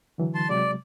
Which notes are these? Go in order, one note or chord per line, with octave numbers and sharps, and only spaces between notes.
D3 E3 F#3
A5 C6
C3 F#3 G#3 D5